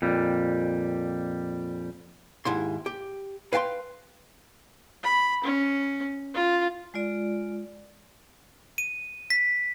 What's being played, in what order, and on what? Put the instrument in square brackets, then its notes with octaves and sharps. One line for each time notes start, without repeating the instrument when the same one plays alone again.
[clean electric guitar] F2 A#2 G3
[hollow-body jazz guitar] D#2 G#2 E4 C6
G4
B4 F5 G5 A5 C6
[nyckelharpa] B5
C#4
F4
[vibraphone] G#3 F4 D5
[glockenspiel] D#7
B6